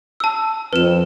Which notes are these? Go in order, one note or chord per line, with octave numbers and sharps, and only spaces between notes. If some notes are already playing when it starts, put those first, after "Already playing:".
A5 E6
F2 B4 E7